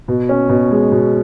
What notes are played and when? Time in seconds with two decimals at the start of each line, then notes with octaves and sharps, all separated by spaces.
0.08 B2
0.29 C#4
0.49 B2
0.71 G#3
0.92 B2